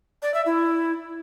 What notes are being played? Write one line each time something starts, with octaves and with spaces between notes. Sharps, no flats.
D5
E5
E4